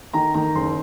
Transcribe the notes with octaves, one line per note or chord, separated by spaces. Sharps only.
D#3 A#5
D#3 A#5
F#1 C6